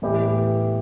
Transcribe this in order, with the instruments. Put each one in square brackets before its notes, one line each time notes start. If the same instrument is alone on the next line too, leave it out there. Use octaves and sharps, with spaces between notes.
[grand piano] A2 E3 B3 E4 G4